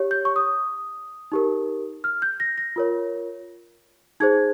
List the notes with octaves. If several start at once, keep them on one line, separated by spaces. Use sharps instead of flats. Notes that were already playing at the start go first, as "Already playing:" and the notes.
Already playing: G4 C#5
G6
C#6
D#6
D#4 G4 A#4
F6
G6
A#6
A#6
F4 A#4 C#5
D#4 G#4 C5 G#6